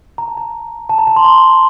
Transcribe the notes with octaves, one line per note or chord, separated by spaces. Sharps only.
A#5
A5
A#5
A5
A#5
A5
C6
A#5